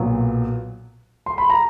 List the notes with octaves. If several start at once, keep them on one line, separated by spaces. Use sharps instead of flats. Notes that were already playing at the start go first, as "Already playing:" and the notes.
Already playing: B1 A#2 F#3 B3
C6
B5
A#5